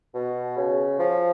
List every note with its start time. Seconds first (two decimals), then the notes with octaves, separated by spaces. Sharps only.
0.14 B2
0.57 C#3
0.99 F3